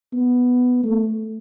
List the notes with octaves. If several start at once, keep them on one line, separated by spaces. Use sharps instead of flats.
B3
A3